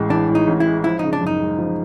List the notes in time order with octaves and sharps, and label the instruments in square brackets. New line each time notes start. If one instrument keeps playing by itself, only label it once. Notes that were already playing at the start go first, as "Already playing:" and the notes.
Already playing: [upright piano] A1 A2 E3 G#3
[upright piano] E3 [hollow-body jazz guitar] D4
[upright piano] A2
[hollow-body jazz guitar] D#4
[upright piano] A1
[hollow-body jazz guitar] E4
[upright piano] G#3
[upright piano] F3 [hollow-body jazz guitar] E4
[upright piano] C#3 [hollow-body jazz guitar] D#4
[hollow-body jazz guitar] D4
[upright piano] F#2
[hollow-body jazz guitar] D#4
[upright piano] G#3
F3